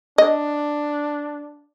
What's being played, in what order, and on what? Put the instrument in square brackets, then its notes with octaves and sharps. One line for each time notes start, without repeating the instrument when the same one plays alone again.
[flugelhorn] D4 [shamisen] D#5